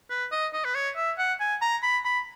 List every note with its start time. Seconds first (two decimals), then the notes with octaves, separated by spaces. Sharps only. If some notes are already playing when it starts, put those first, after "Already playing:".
0.10 B4
0.32 D#5
0.53 D#5
0.65 B4
0.75 C#5
0.96 E5
1.18 F#5
1.40 G#5
1.62 A#5
1.83 B5
2.05 B5